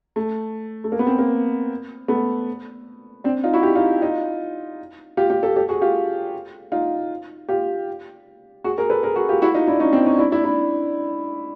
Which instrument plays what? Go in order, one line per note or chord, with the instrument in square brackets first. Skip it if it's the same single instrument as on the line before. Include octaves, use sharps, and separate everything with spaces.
[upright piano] A3
A3
A#3
B3
A#3 C4
A#3
A3 B3
C4 D4
D#4 F4
E4 F#4
F4 G4
D#4 F4
D#4 F4
F4 G4
F4 G4
G4 A4
G4 A4
F#4 G#4
F4 G4
D#4 F4
F4 G4
F#4 G#4
G#4 A#4
A4 B4
G#4 A#4
F#4 G#4
F4 G4
E4 F#4
D#4 F4
D4 E4
C#4 D#4
C4 D4
C#4 D#4
D4 E4
D4 E4
D4 E4